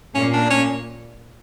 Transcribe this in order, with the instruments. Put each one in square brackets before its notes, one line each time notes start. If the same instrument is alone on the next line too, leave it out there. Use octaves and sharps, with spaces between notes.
[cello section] A#2 A#3 [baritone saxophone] C#4
[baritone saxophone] D4
C#4